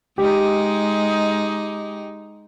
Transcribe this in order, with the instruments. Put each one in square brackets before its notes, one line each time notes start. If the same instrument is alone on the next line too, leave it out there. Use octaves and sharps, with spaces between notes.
[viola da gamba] G#3 D#4 [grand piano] G4